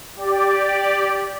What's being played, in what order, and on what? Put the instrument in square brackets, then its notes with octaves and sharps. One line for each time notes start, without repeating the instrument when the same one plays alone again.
[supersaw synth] G4 D5